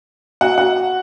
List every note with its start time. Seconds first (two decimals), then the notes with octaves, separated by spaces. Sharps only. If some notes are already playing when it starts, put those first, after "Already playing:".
0.41 F#4 F#5
0.58 F#4 F#5